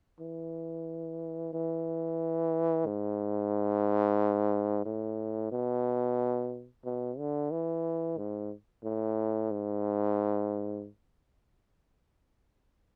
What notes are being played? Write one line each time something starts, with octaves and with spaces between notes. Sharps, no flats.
E3
E3
G#2
A2
B2
B2
D3
E3
G#2
A2
G#2